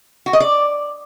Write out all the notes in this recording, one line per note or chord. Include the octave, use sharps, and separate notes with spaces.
F#4
D#5
D5